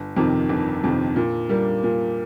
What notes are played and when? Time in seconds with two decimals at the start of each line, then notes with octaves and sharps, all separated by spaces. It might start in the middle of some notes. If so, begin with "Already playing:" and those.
Already playing: G1
0.16 F2 C3 D#3
0.49 G1
0.84 F2 C3 D#3
1.16 A#2
1.49 G3 A#3
1.84 A#2